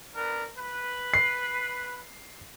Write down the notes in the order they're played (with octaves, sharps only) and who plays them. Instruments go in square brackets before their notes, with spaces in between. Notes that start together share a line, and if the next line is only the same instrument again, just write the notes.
[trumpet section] B3 D4 A#4
B4
[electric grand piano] C7